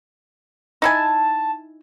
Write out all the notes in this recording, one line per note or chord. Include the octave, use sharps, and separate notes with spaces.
D#4 E4 G#5 A5